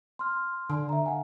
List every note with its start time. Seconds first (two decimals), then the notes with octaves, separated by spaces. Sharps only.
0.19 C6 F6
0.70 D3
0.89 E5 A#5
1.06 F5 F#5 G#5